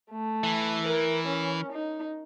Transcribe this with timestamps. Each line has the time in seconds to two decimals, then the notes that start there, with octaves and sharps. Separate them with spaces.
0.10 A3
0.43 E3
0.82 A#4
1.28 C#4
1.72 D#4